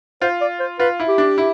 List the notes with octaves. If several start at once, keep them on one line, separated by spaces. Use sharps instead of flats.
F4 C5
D5
C5
F4 B4
E4
G4
D4
E4